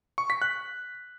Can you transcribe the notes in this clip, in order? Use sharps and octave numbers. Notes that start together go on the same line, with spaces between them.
C#6
B6
F#6